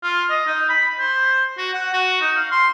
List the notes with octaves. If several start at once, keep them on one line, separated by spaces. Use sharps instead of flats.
F4
D#5
D#4
B5
C5
F#4
F#5
F#4
D#4
F5
C6